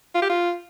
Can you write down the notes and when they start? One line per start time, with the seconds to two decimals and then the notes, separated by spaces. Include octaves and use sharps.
0.15 F4
0.22 G4
0.29 F4